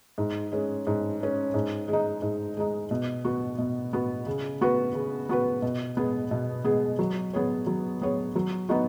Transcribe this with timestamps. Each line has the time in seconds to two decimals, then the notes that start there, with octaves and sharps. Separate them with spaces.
0.18 G#2
0.52 G#3 C#4
0.87 G#2
1.20 G#3 C#4
1.54 G#2
1.88 G#3
1.93 D#4
2.22 G#2
2.57 G#3 D#4
2.91 B2
3.25 B3 F#4
3.58 B2
3.93 B3 F#4
4.26 C#3
4.61 B3 F#4 B4
4.95 C#3
5.29 B3 F#4 B4
5.62 B2
5.97 G#3 B3 G#4
6.31 B2
6.64 G#3 B3 G#4
6.99 F#3
7.33 B3 G#4 C#5
7.67 F#3
8.02 B3 G#4 C#5
8.36 F#3
8.69 B3 D#4 F#4